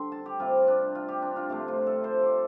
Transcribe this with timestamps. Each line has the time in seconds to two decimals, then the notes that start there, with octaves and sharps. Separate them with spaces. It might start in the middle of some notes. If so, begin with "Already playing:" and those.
Already playing: D3 G3 C4 C6
0.12 A5
0.26 G4
0.40 C3 G3 C4 F4
0.68 D4
0.95 F4
1.08 G4
1.22 D4
1.36 F4
1.49 C3 F3 A3 G4
1.68 F4
1.87 A4
2.04 C5
2.23 D5